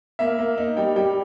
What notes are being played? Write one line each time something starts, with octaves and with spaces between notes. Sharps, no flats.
A#3 E5
A#3
D#4
G3 G5
G3 G5